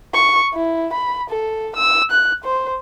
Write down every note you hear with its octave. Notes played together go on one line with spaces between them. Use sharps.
C#6
E4
B5
A4
E6
F#6
C5